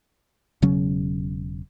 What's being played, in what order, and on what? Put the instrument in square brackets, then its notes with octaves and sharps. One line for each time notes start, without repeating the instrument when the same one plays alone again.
[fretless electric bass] E1 C#3 F#3 C#4